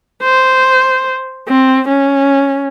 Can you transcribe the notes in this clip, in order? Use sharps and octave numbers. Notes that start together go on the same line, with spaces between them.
C5
C4
C#4